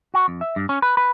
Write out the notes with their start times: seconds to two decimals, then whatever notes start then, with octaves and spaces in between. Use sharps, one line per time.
0.14 F#4
0.28 F2
0.41 E5
0.56 G2
0.69 C#4
0.82 B4
0.97 B4